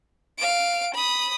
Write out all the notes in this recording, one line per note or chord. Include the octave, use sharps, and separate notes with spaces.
F5 D7
B5 D#6